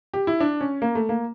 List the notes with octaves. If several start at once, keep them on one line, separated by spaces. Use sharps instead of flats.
G4
E4
D4
C#4
A#3
A3
A#3